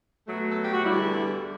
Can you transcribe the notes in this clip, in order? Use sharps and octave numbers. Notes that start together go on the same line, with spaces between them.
B2 F#3 A3
A4
G4
F#4
E2 D3 G3 E4